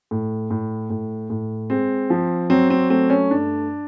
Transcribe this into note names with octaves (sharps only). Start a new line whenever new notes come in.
A2
A2
A2
A2
G#3 C4
F3
F#3 C4
C4
A3 C4
C#4
G2 D4